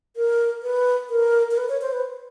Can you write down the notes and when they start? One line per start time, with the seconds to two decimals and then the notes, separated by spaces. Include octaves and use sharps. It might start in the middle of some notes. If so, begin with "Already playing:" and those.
0.16 A#4
0.62 B4
1.10 A#4
1.51 A#4
1.57 B4
1.69 C#5
1.81 C5
1.93 B4